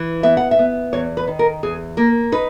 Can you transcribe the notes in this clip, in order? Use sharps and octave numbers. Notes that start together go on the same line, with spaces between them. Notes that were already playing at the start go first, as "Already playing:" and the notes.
Already playing: E3
B3 E5
F#5
E5
B3
E2 C#5
B4
D#3
A#4
E2 G#4
A#3 A#4
D#4 B4